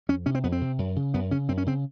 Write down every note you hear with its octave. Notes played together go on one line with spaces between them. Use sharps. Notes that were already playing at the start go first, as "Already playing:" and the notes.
F2 C#4
C3 C#4
C4
F2 B3
C4
C3
F#2
C#3
F#2 B3
C#3 C#4
F#2 C4
C#4
C#3 C4